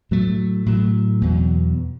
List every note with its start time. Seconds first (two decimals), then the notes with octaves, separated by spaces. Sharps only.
0.11 A2 F#3 A3
0.66 A2 F#3 A3
1.21 E2 B2 F#3